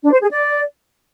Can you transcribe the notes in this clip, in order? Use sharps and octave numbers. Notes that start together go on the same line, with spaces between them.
D4
C5
G#4
D5